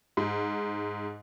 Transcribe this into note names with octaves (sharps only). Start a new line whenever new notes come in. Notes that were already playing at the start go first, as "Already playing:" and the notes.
G#2